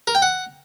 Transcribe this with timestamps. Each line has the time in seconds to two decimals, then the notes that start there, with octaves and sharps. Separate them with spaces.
0.07 A#4
0.15 G5
0.22 F#5